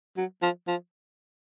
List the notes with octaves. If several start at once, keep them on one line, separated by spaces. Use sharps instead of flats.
F#3
F3
F3